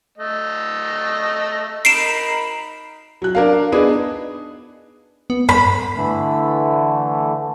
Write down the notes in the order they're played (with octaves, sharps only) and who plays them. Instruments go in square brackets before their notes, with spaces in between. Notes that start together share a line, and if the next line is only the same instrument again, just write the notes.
[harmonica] A3 D#5
[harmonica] D#4 A#4 B5 [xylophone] C7 D7 E7
[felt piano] F#3 F#6
D4 A#4 F5
B3 D4 D#4 G#4
[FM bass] B3
[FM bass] G2 [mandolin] B5
[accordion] D3 E3 A3